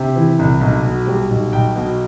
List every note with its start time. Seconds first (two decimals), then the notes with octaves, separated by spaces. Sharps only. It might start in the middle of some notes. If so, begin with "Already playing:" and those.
Already playing: C3
0.16 E3
0.39 C2
0.61 B1
0.85 B2
1.07 G3
1.30 B1
1.53 B1 G5
1.76 B2